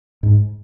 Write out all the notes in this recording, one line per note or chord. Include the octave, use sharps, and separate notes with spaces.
G#2